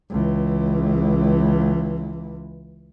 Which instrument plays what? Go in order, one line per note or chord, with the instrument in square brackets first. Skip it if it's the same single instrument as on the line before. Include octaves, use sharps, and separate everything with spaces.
[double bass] C#2 E3